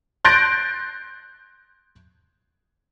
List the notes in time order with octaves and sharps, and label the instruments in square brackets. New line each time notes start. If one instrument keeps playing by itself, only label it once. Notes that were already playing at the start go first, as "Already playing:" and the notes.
[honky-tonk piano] C6 F#6 G6 A6 A#6 D7